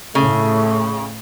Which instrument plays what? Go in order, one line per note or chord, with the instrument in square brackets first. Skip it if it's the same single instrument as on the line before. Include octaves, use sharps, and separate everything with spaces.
[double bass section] A2 [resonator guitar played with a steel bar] C#3 [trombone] A3